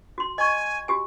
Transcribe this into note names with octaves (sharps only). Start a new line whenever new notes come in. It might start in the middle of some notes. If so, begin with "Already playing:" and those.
F#4 C6
D#5 G#5 C#6
F#4 G4 G#5